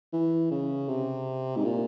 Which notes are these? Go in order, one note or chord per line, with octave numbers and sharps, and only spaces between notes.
E3
C#3
C3
G#2
A#2